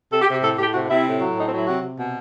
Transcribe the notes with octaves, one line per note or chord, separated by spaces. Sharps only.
C3 A4
G4
C3
G4
A2 A4
A2 G4
C3 F#4
C3 E4
A2
F#3
A2 D#4
C4
F#3
E4
C3 F#4
C3
B2